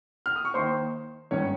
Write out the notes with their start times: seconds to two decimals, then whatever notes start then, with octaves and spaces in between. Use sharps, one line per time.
0.26 F6
0.36 D#6
0.45 C#6
0.54 D#2 D#3 C5 C6
1.31 G#1 G2 D#3 C#4 C#5